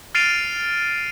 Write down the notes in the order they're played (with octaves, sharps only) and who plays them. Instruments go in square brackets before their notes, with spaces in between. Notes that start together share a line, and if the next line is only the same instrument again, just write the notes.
[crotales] F6 A6 C7 D7 D#7 F7